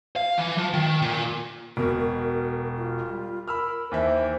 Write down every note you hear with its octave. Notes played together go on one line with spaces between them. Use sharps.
F5
E3
F3
D#3
A#2
E1 B2 A#4
A#4
F4
G3
A#4 B5 E6 F6
D#2 E3 C5 E5